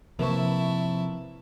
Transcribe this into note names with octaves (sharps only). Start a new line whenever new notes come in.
C3 F3 A#3 E4 B4 A5 C#6